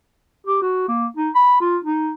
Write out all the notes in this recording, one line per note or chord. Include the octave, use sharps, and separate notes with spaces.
G4
F#4
A#3
D#4
B5
F4
D#4